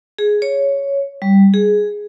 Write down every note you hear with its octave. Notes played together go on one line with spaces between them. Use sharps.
G#4
C#5
G3
G#4